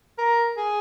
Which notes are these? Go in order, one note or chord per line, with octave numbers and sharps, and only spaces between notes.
A#4
G#4